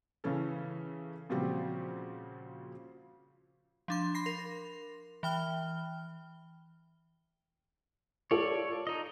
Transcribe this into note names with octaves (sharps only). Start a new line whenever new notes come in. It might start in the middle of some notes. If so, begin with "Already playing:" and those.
C#3 E3 C#4 A4
A#2 C#3 F3 G3 C4 F#4
F3 D4 C6
B5 C6 A#6 C7
A#4
E3 G5 F6 G7
F4 A4 C#5 D5
D#4 D#5